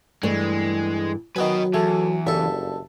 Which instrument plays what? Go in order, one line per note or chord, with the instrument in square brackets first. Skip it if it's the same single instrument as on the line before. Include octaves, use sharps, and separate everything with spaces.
[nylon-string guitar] G2 E3 A3 [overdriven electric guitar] G#3
[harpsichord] D#3 B3 G#5 [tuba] F#3 [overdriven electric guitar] B4 D#5
[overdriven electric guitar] E2 [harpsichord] A3 [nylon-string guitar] G#4
[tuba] F#1 [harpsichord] G2 A4 [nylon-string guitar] E5